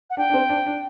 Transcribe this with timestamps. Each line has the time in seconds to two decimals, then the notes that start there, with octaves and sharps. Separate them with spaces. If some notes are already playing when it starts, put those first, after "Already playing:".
0.10 F#5
0.17 D4 G5
0.30 D4
0.34 C4
0.49 D4
0.66 D4